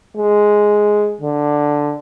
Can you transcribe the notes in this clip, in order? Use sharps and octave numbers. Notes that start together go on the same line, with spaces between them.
G#3
D3